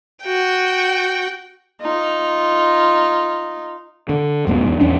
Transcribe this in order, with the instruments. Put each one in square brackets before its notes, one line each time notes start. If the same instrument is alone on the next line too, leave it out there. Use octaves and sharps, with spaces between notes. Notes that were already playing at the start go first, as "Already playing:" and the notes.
[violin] F#4 G5
[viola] D#4 F4
[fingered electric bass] D3
F#1 C#2 B2
E2 G#2
A1 E2 C#4 D4